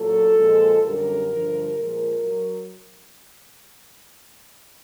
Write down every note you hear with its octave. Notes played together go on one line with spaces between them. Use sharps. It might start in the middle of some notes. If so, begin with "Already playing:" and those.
Already playing: A#2 F#3 A4
A#2 F3 G#3
F#2 D3 G3 A#4
G2 D3 F3
A#2 F3 G#3 A#4
F#3